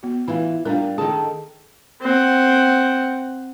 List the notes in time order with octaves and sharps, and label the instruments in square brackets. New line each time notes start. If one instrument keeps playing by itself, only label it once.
[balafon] B3 F#4
[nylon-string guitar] E3 F4 [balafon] E4 B4
[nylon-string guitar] G3 F4 [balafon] D4 A#4
[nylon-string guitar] D#3 A4 A5 [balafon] G#4
[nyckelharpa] C4 F#5